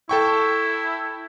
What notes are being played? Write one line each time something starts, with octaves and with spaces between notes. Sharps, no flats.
E4 A4 G5 C#6